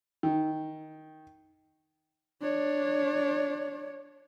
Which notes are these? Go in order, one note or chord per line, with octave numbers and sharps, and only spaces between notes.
D#3
D4 C#5